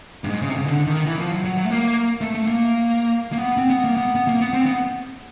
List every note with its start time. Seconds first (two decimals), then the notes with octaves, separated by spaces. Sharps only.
0.24 G2
0.29 G#2
0.42 C#3
0.49 C3
0.55 C#3
0.67 D3
0.87 D#3
1.06 E3
1.19 F3
1.31 F#3
1.45 F#3
1.57 F#3
1.65 A3
1.70 A#3
2.21 A3
2.35 A3
2.47 A#3
3.32 A#3
3.38 B3
3.57 C4
3.70 B3
3.84 A#3
3.97 B3
4.15 B3
4.28 A#3
4.41 B3
4.54 C4
4.66 B3